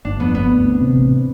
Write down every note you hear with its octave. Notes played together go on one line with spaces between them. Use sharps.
G1 D4
F2 B3
G1 B3
D2
C4
C3
A1